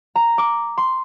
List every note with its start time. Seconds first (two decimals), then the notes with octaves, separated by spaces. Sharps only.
0.15 A#5
0.38 D6
0.78 C6